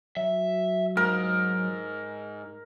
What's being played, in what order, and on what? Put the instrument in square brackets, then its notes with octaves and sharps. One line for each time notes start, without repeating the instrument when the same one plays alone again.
[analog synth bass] F#3 [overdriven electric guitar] E5
[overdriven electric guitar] G#2 [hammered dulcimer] A#4